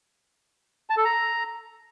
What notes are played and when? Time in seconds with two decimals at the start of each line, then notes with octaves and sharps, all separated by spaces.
0.90 A5
0.97 A4
1.05 A#5